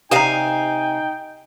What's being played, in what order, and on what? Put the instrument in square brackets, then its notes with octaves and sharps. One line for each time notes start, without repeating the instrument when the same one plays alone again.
[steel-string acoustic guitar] C3 F5 G#5 [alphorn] D#4 [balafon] G4 A#5 [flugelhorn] G5